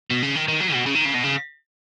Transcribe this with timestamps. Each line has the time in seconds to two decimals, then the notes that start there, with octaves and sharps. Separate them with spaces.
0.10 B2
0.23 C#3
0.36 D#3
0.48 D#3
0.60 F#3
0.73 B2
0.86 C#3
0.95 D#3
1.05 C#3
1.14 B2
1.23 C#3